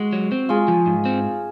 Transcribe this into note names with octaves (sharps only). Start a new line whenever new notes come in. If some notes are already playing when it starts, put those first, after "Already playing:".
Already playing: G#3 F#4
F#3
C4
G#3 F4 G#4
F3
G#2
C4